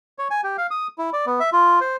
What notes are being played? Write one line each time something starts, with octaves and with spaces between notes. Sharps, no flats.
C#5
G#5
G4
F5
D#6
E4
D5
B3
E5
F4
C5